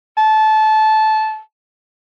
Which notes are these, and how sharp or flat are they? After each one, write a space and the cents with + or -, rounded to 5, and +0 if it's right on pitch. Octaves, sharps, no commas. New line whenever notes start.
A5 -20